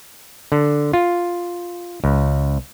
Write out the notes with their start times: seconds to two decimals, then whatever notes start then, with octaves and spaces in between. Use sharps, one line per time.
0.52 D3
0.93 F4
2.04 C#2